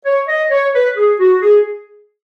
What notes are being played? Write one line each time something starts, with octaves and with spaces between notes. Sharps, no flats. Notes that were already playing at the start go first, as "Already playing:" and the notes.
C#5
D#5
C#5
B4
G#4
F#4
G#4